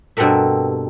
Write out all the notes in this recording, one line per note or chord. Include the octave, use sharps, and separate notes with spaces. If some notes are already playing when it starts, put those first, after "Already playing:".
G2 B2 C4 A4 A#4 E5